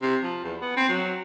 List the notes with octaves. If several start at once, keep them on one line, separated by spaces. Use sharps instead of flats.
C3
F3
E2
B3
C4
F#3